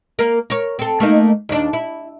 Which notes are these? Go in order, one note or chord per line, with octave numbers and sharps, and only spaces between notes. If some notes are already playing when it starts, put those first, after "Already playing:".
A#3 A#4
A#4 C#5
C4 A4
A3 A#3 D#4
D#2 D4
E4